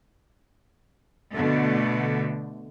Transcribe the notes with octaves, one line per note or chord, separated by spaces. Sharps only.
B2 D3 A3